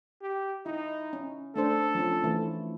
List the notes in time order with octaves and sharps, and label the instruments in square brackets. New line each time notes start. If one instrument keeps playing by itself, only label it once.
[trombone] G4
[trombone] D#4 [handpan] E4
[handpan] C#4
[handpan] A3 D4 C5 [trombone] A4
[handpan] F3 C#4
E3 A3 E4